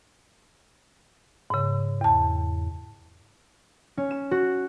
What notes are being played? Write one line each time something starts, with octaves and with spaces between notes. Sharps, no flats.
G#2 C#3
E2 A5
C#4
E7
F#4